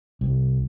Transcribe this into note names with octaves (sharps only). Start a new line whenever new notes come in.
C2